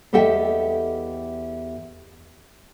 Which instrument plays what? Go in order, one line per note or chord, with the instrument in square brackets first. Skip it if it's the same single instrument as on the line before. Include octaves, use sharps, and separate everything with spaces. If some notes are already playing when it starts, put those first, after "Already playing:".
[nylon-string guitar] E2 G4 A4 D#5 E5 G5